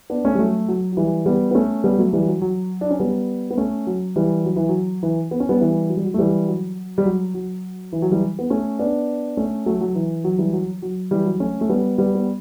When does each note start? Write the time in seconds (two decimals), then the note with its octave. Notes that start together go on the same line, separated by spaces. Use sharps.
0.10 B3 D4
0.25 A3 C#4
0.35 G3
0.39 F#3 A3
0.68 F#3
0.92 F#3
0.97 E3 G3
1.26 G3 B3
1.51 B3
1.55 A3 C#4
1.84 G3 B3
1.98 F#3 A3
2.13 E3 G3
2.27 F#3
2.41 F#3
2.81 D4
2.90 C#4
3.00 G3 B3
3.51 B3
3.58 A3 C#4
3.87 F#3
4.16 E3 G3
4.44 F#3
4.56 E3
4.69 F#3
5.03 E3
5.31 B3
5.40 C#4
5.49 G3 B3
5.60 E3 G3
5.89 F#3
5.97 G3
6.04 F#3
6.14 A3
6.18 E3 G3
6.48 F#3
6.98 G3
7.05 F#3
7.34 F#3
7.92 E3
8.02 F#3
8.12 E3 G3
8.39 B3
8.50 A3 C#4
8.79 B3 D4
9.37 A3 C#4
9.66 F#3 A3
9.81 F#3
9.95 E3
10.24 F#3
10.38 E3 G3
10.53 F#3
10.82 F#3
11.11 E3 G3
11.26 F#3
11.40 A3 C#4
11.61 A3
11.69 G3 B3
11.98 G3 B3
12.15 B3